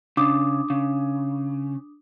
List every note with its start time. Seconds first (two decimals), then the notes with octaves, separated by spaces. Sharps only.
0.17 C#3 D4 D6 D#6
0.70 C#3